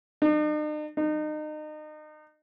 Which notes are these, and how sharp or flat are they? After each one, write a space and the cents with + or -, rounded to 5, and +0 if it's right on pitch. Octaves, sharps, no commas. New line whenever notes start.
D#4 -45
D#4 -30